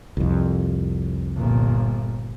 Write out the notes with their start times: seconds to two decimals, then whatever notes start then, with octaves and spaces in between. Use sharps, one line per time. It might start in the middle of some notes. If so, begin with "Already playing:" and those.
0.17 C2 F2
1.36 G1 A#2